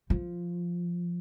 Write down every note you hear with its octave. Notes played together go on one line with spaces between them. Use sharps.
F3